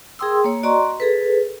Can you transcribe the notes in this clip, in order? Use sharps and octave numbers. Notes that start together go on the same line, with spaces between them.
G#4 A#4 G5 C6 D#6 E6
A#3 C#5
F#4 D5 D#5 A#5 C6 C#6
G#4 A4 B4